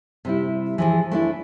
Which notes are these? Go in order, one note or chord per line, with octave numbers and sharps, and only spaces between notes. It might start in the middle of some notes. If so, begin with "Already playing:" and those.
C3 G3 E4
E3 F3 G#4
A3 D4 E4